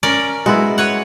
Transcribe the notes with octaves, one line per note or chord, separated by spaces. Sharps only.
C#4 A#4 D5
G#3 B3 E4 F#4
B4 C#5 F#5